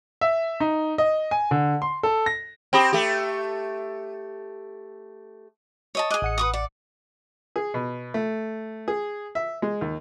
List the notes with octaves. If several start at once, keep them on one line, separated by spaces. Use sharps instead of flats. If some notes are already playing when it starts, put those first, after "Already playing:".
E5
D#4
D#5
G#5
D3
C6
A4
A#6
C4 G4 G5 B5 D#6
A3 G4
C#5 D#5 A5
G#4 D#5 D6 F#6
A1 F#5 C#7
B4 C#6 D#6
D5
G#4
B2
A3
G#4
E5
G#3
D#2